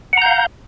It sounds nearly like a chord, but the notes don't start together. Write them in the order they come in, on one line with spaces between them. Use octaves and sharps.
F#5 A#5 G6 F5